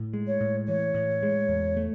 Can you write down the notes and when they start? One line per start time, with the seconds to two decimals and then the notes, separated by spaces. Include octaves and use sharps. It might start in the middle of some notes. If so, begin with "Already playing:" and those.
Already playing: A2
0.13 G#3
0.27 C#5
0.41 A2
0.68 E3 C#5
0.94 A2
1.23 G#3
1.49 E2
1.77 A3